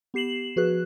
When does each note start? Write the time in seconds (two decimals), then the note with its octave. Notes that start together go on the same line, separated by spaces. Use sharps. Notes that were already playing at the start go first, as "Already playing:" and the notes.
0.14 B3 G4 C7 E7 F#7
0.56 F3 F#4 G#4 B4 F#6